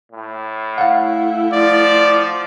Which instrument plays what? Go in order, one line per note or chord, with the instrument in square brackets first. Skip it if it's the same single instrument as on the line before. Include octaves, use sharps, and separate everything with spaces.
[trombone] A2
[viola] A3 E4 [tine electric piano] F5 F#5
[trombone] F3 [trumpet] D5